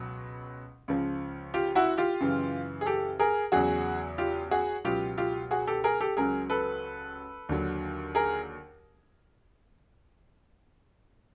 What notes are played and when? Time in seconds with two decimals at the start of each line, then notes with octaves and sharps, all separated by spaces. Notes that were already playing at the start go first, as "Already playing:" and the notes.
Already playing: C#2 B2 F#3
0.88 C#2 C#3 F3
1.54 F4 G4
1.75 E4 F#4
1.98 F4 G4
2.20 F#2 C#3 E3
2.81 G#4
2.86 G4 A4
3.19 G#4 A#4
3.52 E2 C#3 F#3 F#4 G#4
4.18 F4 G4
4.51 F#4 G#4
4.85 C#2 B2 F#3 F4 G4
5.18 F4 G4
5.51 F#4 G#4
5.67 G4 A4
5.84 G#4 A#4
6.01 G4 A4
6.17 C#2 C#3 F#3 G#4 A#4
6.50 A4 B4
7.49 D#2 D3 F#3
8.15 G#4 A#4